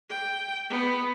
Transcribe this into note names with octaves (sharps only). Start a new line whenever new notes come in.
G5
B3